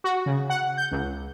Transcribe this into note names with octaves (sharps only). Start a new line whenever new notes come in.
F#4
C#3
F#5
G6
C#2